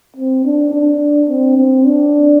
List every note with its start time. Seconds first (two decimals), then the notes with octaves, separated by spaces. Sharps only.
0.16 C4
0.45 D4
0.73 D4
1.29 C4
1.57 C4
1.86 D4